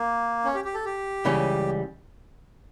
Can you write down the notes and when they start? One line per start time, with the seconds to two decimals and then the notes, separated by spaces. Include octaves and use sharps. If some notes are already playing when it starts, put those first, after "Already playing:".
Already playing: A#3
0.45 C#4
0.54 G4
0.65 G4
0.74 A4
0.85 G4
1.25 C#2 C#3 E3 G3 C#4